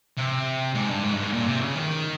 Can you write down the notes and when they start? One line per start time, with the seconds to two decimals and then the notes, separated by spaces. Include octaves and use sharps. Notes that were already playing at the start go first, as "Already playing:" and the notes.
0.17 C3
0.75 G#2
0.89 G2
1.04 G#2
1.13 G2
1.23 G#2
1.32 A#2
1.47 C3
1.61 C#3
1.75 D#3